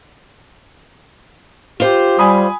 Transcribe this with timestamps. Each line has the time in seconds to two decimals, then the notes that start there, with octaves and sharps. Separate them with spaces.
1.80 F4 G4 C5
2.19 G3 G#5 B5 D#6